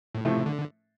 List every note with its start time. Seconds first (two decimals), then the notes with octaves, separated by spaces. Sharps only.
0.15 A2
0.25 A2 C3 F3 A3
0.46 D3